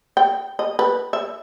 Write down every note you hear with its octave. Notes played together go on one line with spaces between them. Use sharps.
G5
D#5
B4
E5